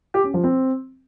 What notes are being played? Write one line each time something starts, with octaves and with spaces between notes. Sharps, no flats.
G4
C#4
F3
C4